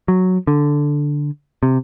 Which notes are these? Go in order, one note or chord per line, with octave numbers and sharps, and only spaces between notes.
F#3
D3
C3